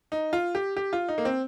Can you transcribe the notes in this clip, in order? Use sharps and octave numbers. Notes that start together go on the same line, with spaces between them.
D#4
F4
G4
G4
F4
D#4
A#3
C4